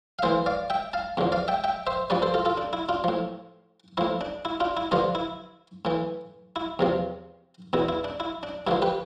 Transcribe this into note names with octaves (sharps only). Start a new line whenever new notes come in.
F5
A2 E3 C5 E5
D5 F5
E5 G5
F5 A5
E2 D3 F3
D5 F5
E5 G5
E5 G5
C5 E5
G2 F3 B4 D5
A4 C5
F4 A4
F4 A4
D4
E4
D4 F4
A2 F3
A2 F3 E4
D4
E4
D4 F4
E4
G2 D3 F3 D4 F4
E4
A2 E3
E4
E2 C3 F3
E2 B2 E4
E4
D4
E4
D4
G2 D3 F3 E4
G4 B4